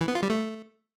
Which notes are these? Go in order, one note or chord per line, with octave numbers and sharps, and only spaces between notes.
E3
B3
F4
G3
A3